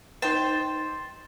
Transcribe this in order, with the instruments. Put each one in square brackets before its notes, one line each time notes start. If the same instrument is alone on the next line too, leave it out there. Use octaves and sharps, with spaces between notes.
[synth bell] D#4 A6 [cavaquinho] C5 G5